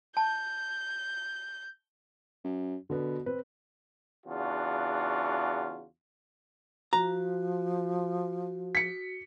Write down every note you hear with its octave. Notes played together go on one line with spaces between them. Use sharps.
A5 G6
F#2
B2 D3 B3
C4 B4
E2 C#3 D4 F4 F#4
F3 F#4 A#5
B6 C#7